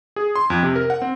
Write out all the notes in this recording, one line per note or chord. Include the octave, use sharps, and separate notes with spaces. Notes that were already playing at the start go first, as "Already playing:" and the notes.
G#4
C6
F2
C3
A#4
F#5
C4